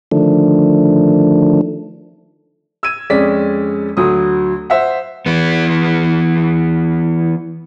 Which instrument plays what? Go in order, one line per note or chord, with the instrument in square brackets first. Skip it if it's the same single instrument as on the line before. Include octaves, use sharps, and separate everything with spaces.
[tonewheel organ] D3 D#3 F3 A3 D4
[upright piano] E6 G#6 D#7
F2 G#3 C#4 D5 B6
D2 F#3 D#6
C5 E5 F#5
[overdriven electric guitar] E3 B3